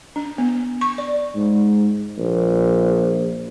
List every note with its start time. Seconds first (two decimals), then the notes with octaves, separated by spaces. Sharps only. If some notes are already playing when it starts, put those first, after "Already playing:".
0.16 D4
0.38 B3
0.81 C#6
0.98 D5
1.35 G#2
2.19 A#1